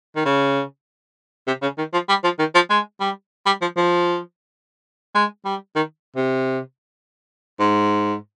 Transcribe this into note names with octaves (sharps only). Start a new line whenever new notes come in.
D#3
C#3
C3
C#3
D#3
F3
G3
F3
D#3
F3
G#3
G3
G3
F3
F3
G#3
G3
D#3
C3
G#2